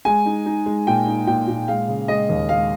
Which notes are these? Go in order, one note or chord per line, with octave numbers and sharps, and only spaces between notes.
G#3 G#5
D#4
D#4
G#3
A#2 G5
D#4
A#2 G5
A#2
G#3 F5
C#3
G#3 D#5
D#2
G#3 F5